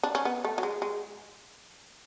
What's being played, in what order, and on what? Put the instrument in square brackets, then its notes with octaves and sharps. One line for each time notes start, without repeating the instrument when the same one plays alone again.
[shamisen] D4
C#4
B3
A3
F#3
G#3
G#3